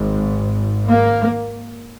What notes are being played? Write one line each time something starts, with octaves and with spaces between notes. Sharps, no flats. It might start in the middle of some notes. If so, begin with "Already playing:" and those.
Already playing: G#1 G#2
A#3